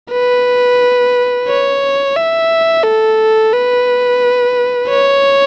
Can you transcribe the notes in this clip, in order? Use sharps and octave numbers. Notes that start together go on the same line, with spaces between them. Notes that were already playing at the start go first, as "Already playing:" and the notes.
B4
C#5
E5
A4
B4
C#5